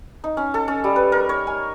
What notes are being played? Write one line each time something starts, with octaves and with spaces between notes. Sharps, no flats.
D#4
C#4
A4
C#4
G3
B4
A#4
C#5
G#5